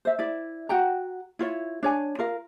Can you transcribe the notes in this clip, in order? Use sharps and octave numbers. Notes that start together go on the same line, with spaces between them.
C5 E5
E4 D5 E5
F#4 F#5 G5 A#5
E4 F4 C#5
D4 C#5 G#5
F4 A#4 F5